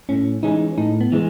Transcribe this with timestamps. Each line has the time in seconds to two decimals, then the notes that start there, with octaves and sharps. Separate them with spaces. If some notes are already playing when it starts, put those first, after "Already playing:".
0.09 A2 C#4
0.43 E3 G#3 C#4 D#4
0.78 A2 D#4
1.01 B3
1.12 E3 G#3